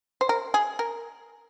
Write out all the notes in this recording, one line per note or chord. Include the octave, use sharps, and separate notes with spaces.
C5
A#4
G#4
A#4